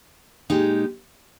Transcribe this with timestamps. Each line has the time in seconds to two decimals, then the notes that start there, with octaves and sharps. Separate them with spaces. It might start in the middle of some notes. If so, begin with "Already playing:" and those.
0.50 A#2 G#3 D#4 G4